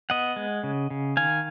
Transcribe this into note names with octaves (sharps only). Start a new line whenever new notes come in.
B3 D#5 F#5
G#3
C#3
C#3
D#3 F5 G#5